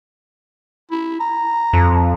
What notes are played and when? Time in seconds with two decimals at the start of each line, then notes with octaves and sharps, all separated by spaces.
0.91 E4
1.20 A#5
1.73 F2